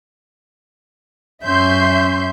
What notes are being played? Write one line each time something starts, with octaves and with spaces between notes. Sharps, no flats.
F#2 C#4 E5 C6 G6